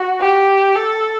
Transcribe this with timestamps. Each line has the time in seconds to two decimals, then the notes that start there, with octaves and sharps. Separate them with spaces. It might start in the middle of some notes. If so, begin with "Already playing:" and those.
Already playing: F#4
0.20 G4
0.76 A4